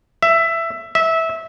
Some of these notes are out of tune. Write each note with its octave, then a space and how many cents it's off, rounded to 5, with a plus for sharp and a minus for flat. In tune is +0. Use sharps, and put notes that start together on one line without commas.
E5 +15
E5 -15